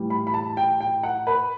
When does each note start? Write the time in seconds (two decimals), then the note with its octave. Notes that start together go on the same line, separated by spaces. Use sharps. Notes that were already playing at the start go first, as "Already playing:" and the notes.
Already playing: A2 E3 G3
0.10 B5
0.27 B5
0.34 A5
0.57 G5
0.81 G5
1.03 F#5
1.27 B4